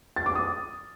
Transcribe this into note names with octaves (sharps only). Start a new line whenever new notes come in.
A6
D6
D#6